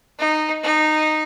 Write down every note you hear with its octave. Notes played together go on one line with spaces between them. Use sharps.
D#4
D#4